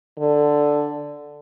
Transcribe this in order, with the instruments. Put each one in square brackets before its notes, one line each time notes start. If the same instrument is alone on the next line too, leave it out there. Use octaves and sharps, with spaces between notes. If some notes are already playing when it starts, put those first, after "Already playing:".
[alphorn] D3